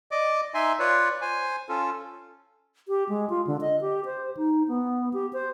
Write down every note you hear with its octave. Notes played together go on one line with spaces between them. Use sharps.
D5 D#5 D6
D#4 E5 G#5 C6
F4 B4 C#5 D5
C5 G#5
C#4 F4 A4
G4
G#3
F4
D3
D#5
G4
C5
D#4
B3
G4
C5